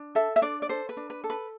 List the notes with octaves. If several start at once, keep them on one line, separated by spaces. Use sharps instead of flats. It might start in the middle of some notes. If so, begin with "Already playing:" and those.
Already playing: D4
A4 E5
E5
D4 D5
D5
A4 C5
B4
D4
B4
A4
B4